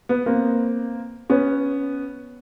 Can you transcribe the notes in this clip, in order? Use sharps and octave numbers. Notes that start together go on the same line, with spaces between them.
B3
A#3 C4
B3 C#4